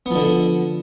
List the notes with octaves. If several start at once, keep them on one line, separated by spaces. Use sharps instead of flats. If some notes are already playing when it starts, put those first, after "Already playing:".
D3 F3 B3